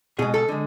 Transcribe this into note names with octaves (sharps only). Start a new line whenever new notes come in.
B2 G#3 G#4
A4
D3 G#3